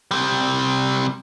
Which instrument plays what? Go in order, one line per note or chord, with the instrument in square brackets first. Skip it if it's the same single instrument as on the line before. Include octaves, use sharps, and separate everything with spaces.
[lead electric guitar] C3 G3